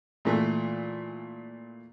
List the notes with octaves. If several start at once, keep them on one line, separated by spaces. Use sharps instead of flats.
A#2 E3 A3